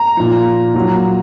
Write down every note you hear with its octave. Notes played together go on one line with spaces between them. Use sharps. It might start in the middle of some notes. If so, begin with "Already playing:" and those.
Already playing: A#5
A#2 F3
A#2 F#3